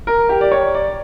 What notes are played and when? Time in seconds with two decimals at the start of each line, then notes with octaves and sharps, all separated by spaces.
0.07 A#4
0.29 G4
0.41 D5
0.52 C#5
0.74 D5